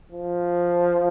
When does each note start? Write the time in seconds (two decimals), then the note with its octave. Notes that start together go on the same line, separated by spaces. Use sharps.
0.12 F3